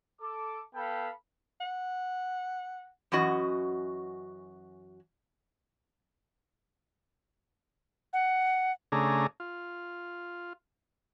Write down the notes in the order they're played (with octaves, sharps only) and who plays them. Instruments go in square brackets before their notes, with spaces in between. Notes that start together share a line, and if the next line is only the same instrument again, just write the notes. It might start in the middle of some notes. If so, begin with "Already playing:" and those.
[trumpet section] A4 D6
B3 A4 F5 G5 B5
[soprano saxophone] F#5
[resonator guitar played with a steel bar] F#2 E3 C#4 F#4 D#5
[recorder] F#5
[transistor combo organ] C#3 A3 D4 G#4 A#5
F4